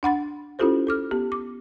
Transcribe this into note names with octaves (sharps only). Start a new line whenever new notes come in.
D4 F#5 B5 A6
C#4 E4 F4 G4 A4 C5
A4 D6 F6
B3 G4
D6